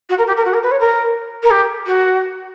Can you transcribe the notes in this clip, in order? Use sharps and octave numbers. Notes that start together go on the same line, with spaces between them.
F#4
A#4
G4
A#4
F#4
A#4
B4
C#5
A#4
A#4
G4
F#4